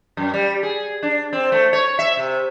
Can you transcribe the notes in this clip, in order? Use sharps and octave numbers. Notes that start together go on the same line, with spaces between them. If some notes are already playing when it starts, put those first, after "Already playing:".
F#2
G3
G#4
D4
C4
A3
C#5
E5
C3